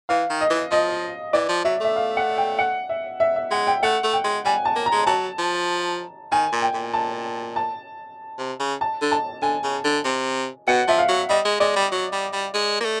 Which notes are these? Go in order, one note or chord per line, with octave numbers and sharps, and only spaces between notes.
E3 F5
D#3
D#5
E3
F3 D#5
E3 D5
F3
F#3 E5
A3 E5
F5
F#5
G5
F#5
E5
E5
E5
G#3 F#5
G5
A3 F#5
A3
G5
G#3
G3 G#5
A5
A#3
A#5
G#3
F#3 A5
F3
D#3 G#5
A#2
G5
A#2
A5
A5
C3
C#3
A5
D3
A5
D3 G#5
C#3
D3
C3
B2 F#5
F3 E5
F5
F#3
G3 D#5
G#3
G#3 D5
G3
F#3
G3
G3
G#3
A#3
A3